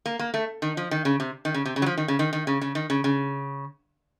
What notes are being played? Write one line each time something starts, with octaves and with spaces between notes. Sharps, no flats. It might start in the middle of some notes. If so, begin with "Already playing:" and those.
A#3
A#3
A3
D#3
F3
D#3
C#3
C3
D#3
C#3
C3
C#3
F#3
F3
D#3
C#3
D#3
D#3
C#3
C#3
D#3
C#3
C#3